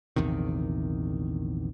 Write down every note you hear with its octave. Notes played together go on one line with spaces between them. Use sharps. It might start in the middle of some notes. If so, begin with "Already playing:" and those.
A#1 E2 C3 D#3